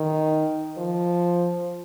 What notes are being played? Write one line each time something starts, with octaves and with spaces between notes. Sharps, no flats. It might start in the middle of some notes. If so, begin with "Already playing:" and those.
Already playing: D#3
F3